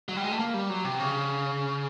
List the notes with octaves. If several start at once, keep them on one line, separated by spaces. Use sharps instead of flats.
F#3
G3
G#3
A3
A#3
G3
F#3
C3
C#3